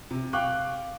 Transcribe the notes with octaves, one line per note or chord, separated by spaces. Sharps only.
C3
F5 G5 C#6 D6 F#6